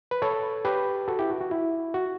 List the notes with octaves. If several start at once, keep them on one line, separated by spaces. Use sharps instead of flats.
B4
A4 C#5
G4 B4
F#4 A4
E4 G4
F#4
F#4
E4
F#4